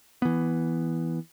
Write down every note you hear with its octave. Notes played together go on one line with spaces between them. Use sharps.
E3 B3